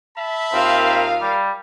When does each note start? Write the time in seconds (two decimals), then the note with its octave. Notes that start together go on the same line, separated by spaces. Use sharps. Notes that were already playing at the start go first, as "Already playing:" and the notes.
0.17 E5 A5 B5
0.53 D#2 C4 D#4 F4 A#4 F5
1.21 G3